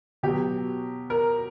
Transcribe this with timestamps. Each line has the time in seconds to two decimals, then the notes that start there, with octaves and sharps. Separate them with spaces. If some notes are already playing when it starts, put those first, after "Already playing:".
0.23 B2 F#3 G4
1.10 A#4